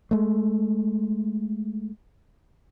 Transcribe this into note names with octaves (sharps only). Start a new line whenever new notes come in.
G#3 A3